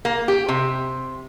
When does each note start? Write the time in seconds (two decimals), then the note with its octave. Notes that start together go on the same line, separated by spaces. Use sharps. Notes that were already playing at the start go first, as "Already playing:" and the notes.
0.05 A#3
0.28 G4
0.48 C3